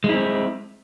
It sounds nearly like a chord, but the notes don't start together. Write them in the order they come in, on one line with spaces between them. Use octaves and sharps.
G#3 E4 C4